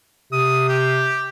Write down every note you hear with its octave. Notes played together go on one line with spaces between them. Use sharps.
C3 D#6
G4